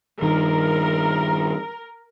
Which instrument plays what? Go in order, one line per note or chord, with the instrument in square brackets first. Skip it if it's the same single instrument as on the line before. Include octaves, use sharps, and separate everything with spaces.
[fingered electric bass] G2 D#3 [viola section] A#4